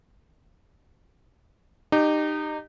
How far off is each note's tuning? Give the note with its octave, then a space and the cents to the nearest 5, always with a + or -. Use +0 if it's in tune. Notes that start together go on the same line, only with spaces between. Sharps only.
D#4 -25 G4 +0